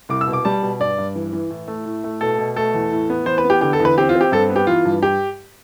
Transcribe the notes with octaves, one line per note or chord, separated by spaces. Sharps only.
C2 D6
E6
B2
D6
G3 A5
B2
G2 D5
G2
E3
E3
A2
A3
A2
A3
B2 A4
B2
A3 A4
E2
A2
B3
E3 C5
B4
B3
G4
D3 G4
A4
E2
B4
C4 G4
F4
C4
G4
G2 A4
B3
G4
E3 F4
G2
G4